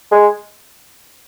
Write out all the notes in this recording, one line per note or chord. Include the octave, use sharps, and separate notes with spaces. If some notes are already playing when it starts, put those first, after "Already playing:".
G#3